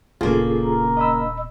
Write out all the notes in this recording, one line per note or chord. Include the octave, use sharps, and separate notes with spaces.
D#1 C#3 A#3 F4 G#4 A4
A#4
D#5 B5 E6